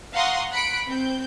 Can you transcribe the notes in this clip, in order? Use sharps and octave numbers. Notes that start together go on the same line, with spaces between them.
F5 F#5 A#5 C6 C#6 D#6
B5 F#6 B6 C#7 D7
C4 G6